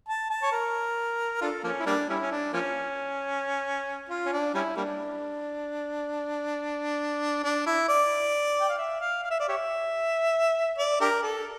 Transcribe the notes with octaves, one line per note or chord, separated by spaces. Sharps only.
A5
A5
C#5
A#4
D4 F4 A4
F3 A#3 C#4
E4
G3 A#3 D4
G3 C#4 E4
C#4
D4
F3 A#3 C#4
F4
C#4
D4
G3 C#4 E4
G3 A#3 D4
D4
E4
D5
G5
F5
E5
F5
F5
E5
D5
G4 C#5 E5
D5
D4 G4 A#4
A4